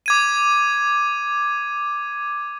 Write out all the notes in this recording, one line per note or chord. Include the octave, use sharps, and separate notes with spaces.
D6 G#6 D#7